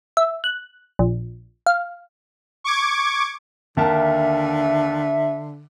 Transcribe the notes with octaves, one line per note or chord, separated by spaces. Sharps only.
E5
F#6
A#1
F5
C#6 D6 G#6
D#2 D3 A#4 E5 A5